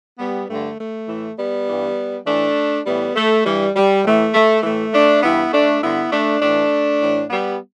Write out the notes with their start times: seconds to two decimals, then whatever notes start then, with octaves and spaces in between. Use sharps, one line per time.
0.19 G3 B3
0.49 G2 D3 A3
0.79 A3
1.08 A2 E3
1.38 G3 B3
1.67 G2 E3
2.26 A2 E3 A3 D4
2.86 A2 E3 G3 B3
3.16 A3
3.45 G2 E3 G3
3.75 G3
4.05 A2 E3 A3
4.34 A3
4.63 A2 E3 A3
4.93 A3 D4
5.23 G2 E3 B3 E4
5.52 A3 D4
5.82 G2 D3 B3 E4
6.11 A3 D4
6.41 A2 E3 A3 D4
7.01 A2 E3
7.30 G3 B3